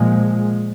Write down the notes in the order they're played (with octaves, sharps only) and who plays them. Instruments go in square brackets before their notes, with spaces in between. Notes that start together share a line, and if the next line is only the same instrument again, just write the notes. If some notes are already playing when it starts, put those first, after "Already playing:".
Already playing: [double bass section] A#2 F3 G#3